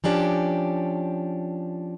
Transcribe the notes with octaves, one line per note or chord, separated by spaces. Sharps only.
F3 C#4 D4 G4